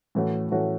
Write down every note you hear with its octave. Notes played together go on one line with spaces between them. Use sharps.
A2 E3 A3 C#4 F#4
A2 E3 A3 C#4 F#4